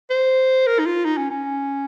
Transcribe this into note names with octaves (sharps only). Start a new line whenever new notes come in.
C5
A#4
D#4
F4
D#4
C#4
C#4